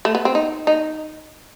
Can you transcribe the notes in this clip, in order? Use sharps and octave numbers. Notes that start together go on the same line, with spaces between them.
A3
B3
C4
D#4
D#4